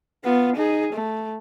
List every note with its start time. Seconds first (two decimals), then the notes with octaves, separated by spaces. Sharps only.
0.24 B3 F4
0.56 D#4 G#4
0.93 A3